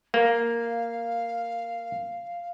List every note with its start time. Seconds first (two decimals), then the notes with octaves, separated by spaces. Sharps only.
0.14 A#3 F5